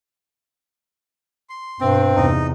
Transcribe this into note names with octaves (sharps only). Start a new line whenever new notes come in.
C6
G2 B2 C4
E2 C3 D#4